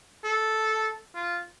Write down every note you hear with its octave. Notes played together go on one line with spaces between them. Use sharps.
A4
F4